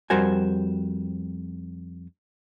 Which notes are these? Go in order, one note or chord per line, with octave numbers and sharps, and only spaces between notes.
F2 G3 F#4 A#4 C5 G#5